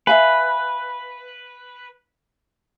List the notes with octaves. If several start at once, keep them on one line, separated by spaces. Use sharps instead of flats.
B4 E5 F5 G#5